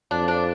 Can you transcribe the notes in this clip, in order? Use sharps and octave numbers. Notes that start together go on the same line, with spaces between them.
F2 D4
D4